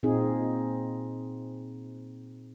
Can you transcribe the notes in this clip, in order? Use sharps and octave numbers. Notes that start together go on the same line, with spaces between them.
A#2 C4 D#4 F4 G#4